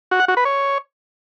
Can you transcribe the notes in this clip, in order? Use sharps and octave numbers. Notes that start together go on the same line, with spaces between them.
F#4
F#5
F#4
B4
C#5